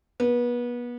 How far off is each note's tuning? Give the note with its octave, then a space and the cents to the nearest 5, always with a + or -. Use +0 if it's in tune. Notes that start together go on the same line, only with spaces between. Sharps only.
B3 -30